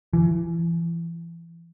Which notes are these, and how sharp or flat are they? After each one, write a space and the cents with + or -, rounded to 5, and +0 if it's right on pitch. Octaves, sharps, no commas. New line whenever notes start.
E3 +30